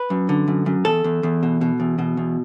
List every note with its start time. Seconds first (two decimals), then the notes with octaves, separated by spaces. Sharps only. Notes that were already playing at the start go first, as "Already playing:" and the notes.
Already playing: B4
0.10 F#2
0.29 D3
0.48 F#2
0.66 F#2
0.85 E2 A4
1.04 E2
1.23 E2
1.43 B2
1.61 B2
1.80 E2
1.99 B2
2.17 E2